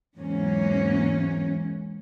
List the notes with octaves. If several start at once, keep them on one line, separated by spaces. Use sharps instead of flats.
E2 G#2 E3 F#3 A#3 C#4